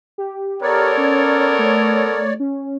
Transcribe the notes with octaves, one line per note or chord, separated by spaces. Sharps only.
G4
B3 A4 A#4 C#5 D5
C#4
A3
C#4